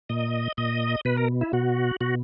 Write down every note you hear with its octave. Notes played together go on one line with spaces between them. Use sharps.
A#2 D#5
A#2 D#5
B2 B4
A#4
E4
B2 F#4
B2 F#4